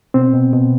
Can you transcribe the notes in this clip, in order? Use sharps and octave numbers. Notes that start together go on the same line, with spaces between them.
B2 C4
B2
B2